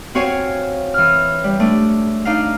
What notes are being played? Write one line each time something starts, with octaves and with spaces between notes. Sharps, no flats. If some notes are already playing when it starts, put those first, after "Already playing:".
C4 F#4 C#5 F5 G#5
E3 F6
G3
A3 D4
D4 D#4 F5